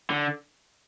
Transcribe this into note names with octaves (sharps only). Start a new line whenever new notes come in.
D3